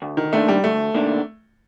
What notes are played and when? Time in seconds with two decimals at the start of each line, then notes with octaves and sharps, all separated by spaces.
0.02 D2
0.17 D#3
0.33 C3 D#3 A3 A#3 D4
0.48 G3
0.64 D2 A3
0.94 C3 D#3 A#3 D4